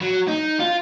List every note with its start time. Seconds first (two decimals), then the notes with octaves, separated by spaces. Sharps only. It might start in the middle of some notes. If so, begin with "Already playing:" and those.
0.01 F#3
0.28 D#4
0.60 F4